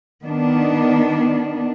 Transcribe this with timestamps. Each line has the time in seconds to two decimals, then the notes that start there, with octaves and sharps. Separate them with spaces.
0.24 D#3 B3 D4